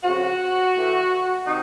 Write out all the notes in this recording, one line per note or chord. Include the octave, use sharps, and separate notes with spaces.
F2 C#3 F3 F#4
A2 E3 A3
C3 D#3 D#4